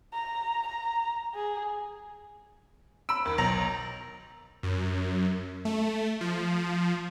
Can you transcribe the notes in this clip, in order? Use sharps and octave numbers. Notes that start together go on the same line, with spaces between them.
A#5
A#5
G#4
B5 E6 D7
D#2
B1 A#5
F#2
A3
F3